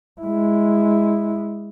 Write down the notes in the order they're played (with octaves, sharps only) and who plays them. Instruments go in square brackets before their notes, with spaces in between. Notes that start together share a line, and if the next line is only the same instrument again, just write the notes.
[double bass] G#3 E4